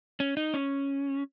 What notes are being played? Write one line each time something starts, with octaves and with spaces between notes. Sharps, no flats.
C#4
D#4
C#4